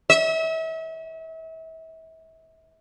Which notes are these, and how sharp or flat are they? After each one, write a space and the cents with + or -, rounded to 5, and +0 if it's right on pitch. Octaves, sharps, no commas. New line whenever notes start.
E5 -35